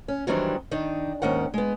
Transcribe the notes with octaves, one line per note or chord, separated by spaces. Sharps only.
C#4
D#3 E3 F#3 G3 C4 D4
D#3 D4 D#4
D#2 G#2 D#3 C#4 F#5
G#3 B3